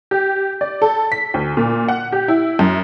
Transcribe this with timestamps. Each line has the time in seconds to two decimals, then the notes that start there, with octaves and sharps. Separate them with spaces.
0.11 G4
0.61 D5
0.82 A4
1.12 B6
1.34 D2
1.57 A#2
1.88 F#5
2.12 G4
2.28 E4
2.59 F#2